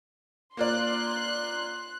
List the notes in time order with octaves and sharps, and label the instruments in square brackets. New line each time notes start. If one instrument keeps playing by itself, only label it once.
[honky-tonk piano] A#3 F4 D5 [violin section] C6 F#6